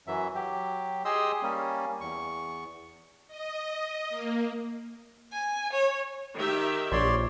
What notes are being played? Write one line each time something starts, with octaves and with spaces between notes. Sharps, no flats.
F#2 E3 F#3 E5
F#3 G4
G4 G#4 D#5 C6 D#6 E6
G3 A#3 C#4
E2 C#6
D#5
A#3
G#5
C#5
D#3 G4 E5
A#1 C#5 D5 C6